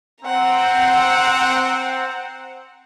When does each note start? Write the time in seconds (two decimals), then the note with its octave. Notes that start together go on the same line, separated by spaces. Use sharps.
0.24 C4 F#5 A#5